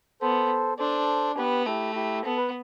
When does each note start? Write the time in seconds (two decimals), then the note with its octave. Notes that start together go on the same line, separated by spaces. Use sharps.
0.21 B3 A4 C5
0.79 D4 A4 C5
1.37 B3 G4 B4
1.66 A3 E4 G4
1.95 E4 G4
2.25 B3 A4
2.37 B4